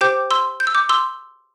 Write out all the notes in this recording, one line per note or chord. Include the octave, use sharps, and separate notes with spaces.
G4 C5 G5 D6 G6
C6 E6
G6
E6
D6 G6
C6 E6